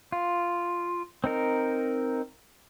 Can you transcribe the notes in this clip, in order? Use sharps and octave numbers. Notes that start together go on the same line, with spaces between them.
F4
C4 D#4 A#4